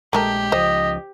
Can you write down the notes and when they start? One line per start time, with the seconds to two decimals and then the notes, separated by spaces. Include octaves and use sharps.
0.13 A#1 G#3 A3 G4 A#4 A5
0.52 C#2 F3 C5 D#5